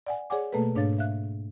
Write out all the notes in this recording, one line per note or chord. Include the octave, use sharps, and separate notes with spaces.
D5 F#5 G#5
G#4 C#5 D5 F#5 G#5 D6
B2 A3 A#3 G#4 A4 B4
G#2 D4 C#5 F5 A6
E5 F5 F#6